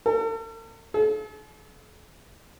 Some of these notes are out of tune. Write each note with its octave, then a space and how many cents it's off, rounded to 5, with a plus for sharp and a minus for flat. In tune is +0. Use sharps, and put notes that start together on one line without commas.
A4 +45
A4 -45